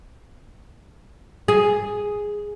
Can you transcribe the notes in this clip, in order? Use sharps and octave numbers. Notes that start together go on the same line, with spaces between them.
G#4